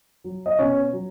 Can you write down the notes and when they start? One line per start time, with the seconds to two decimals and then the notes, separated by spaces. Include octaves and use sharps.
0.24 F#3
0.46 D#5
0.59 B2 C#4 C#5
0.93 F#3